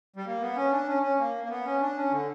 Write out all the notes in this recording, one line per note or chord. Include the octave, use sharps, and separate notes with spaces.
G3
A#3
B3
C#4
D4
C#4
C#4
A#3
A#3
B3
C#4
D4
C#4
D3